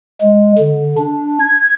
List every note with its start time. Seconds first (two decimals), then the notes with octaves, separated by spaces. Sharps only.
0.21 G#3
0.58 D3
0.98 D4
1.39 G#6